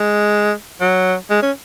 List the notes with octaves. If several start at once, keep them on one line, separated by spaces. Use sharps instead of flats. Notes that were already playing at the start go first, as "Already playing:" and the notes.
Already playing: G#3
F#3
G#3
C#4